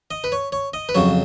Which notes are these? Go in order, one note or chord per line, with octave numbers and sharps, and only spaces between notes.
D#5
B4
C#5
C#5
D#5
B4
F2 C#3 F#3 C#5